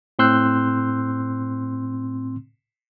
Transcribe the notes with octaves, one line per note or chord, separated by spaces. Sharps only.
A2 C4 C6 E6 F#6 G6